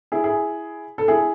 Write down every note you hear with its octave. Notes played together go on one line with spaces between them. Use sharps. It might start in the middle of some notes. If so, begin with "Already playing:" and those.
E4 G#4
E4 G#4
A4
E4 G#4